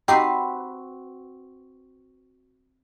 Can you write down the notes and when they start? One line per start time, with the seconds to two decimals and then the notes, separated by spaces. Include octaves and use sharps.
0.08 C4 D#4 F#4 G4 B4 C7